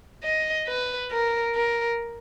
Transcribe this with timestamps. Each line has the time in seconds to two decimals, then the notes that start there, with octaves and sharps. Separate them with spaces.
0.24 D#5
0.67 B4
1.11 A#4
1.55 A#4